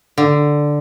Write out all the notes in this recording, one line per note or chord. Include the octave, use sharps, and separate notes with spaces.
D3